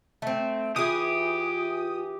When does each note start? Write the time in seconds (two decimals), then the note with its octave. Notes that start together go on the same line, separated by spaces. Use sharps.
0.22 A3 C4
0.76 E3 F4 G4 G#4 D#6